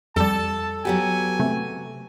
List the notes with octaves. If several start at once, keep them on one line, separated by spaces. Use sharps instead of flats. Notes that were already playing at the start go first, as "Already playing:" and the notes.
F2 G3 A4 A5
F#3 B3 G4 G#5
C3 A3